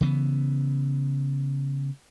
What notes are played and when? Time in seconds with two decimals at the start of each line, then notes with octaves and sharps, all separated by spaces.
0.01 C#3 E3 B3